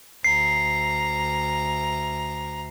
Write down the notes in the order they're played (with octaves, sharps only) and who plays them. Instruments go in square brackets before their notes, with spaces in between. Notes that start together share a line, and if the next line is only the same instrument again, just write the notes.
[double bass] D2 [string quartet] A#5 [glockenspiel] C7